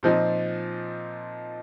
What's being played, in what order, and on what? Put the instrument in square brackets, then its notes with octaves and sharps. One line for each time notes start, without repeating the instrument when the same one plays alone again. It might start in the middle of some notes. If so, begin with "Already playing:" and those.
[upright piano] A#2 F3 C4 D#4